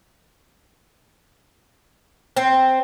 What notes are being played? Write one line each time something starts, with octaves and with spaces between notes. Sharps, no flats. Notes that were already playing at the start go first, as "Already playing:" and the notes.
C4